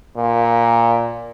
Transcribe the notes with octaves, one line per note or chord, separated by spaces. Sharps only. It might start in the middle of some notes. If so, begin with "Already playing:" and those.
A#2